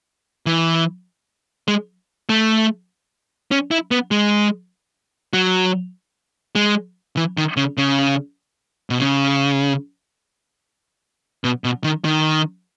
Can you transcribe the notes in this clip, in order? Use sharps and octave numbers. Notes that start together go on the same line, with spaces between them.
E3
G#3
A3
C#4
E4
B3
G#3
F#3
G#3
E3
D#3
C#3
C#3
B2
C#3
B2
B2
D#3
D#3